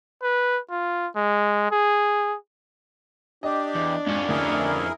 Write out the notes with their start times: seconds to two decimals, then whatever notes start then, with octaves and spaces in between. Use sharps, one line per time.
0.23 B4
0.70 F4
1.16 G#3
1.71 G#4
3.43 D4 G4 D#5
3.75 E2
4.06 F2 G#2 C#4
4.29 D2 E4 G#4 A#4